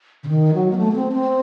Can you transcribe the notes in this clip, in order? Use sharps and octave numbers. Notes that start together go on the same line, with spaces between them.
C#3
D#3
F#3
A#3
A3
A#3
C4
C4